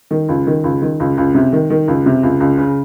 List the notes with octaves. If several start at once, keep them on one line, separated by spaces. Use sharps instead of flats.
D#3
C#2
D#3
C#2
D#3
C#2
C#2
C3
D#3
D#3
C#2
C3
C#2
C#2
C#3